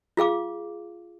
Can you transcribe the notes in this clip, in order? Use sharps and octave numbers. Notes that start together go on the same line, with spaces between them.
F4 G#4 F5 D6